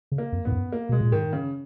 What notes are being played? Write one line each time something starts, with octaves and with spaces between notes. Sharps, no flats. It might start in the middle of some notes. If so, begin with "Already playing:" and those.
C#3
A#3
F2
G#2 B3
F#2
A#3
B2 G#3
A#2
G#2 D#3
C#3